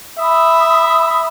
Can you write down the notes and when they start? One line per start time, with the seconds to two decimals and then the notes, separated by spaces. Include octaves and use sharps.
0.19 E5 B5 D#6